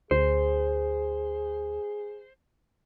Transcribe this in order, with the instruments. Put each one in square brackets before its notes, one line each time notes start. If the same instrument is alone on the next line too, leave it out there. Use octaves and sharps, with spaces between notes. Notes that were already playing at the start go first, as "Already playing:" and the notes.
[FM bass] D2 [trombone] G#4 [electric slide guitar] C5